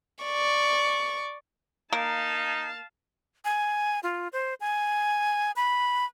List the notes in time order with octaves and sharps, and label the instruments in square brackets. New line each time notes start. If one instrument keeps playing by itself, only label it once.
[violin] D5 C#6
[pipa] A#3 [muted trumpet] D#4 [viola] F5 A5
[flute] G#5
F4
C5
G#5
B5